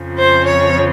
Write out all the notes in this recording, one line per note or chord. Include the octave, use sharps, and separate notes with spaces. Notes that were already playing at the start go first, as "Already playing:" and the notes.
Already playing: F2 C#3 F3
C5
C#5